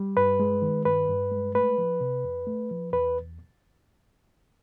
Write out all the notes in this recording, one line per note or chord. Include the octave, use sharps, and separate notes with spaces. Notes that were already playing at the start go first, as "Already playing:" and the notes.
Already playing: G3
G2 B4
G#3
D#3
G2 B4
G2
G#3
A3 B4
F3
C3
F2
A3
F3
E2 B4